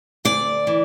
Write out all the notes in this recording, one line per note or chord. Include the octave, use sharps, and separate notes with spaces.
D2 D5
E3